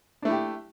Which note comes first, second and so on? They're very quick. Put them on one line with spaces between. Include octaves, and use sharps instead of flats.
D4 A3 E4 G4